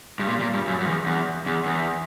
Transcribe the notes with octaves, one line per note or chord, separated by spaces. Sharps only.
G2
A#2
A#2
G2
F#2
F#2
E2
E2
E2
E2